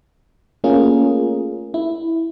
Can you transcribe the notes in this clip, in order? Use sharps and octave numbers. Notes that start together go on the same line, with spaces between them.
A3 A#3 C#4 F4 G#4 A#4
E4